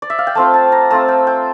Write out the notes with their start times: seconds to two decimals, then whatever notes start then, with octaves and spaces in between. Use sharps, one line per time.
0.02 D5
0.10 E5
0.18 F5
0.27 G5
0.35 A3 C4 F4 A5
0.54 A5
0.72 A#5
0.90 A3 C4 F4 A5
1.08 G5
1.27 G5